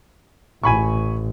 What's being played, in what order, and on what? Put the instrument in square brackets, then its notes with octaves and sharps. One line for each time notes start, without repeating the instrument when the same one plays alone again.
[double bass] A1 [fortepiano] G#5 B5 C#6